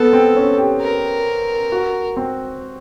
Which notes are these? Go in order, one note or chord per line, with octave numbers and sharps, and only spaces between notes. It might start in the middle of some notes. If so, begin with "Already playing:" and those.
Already playing: B3 A4
C4
C#4
G4
A#4
F#4
C4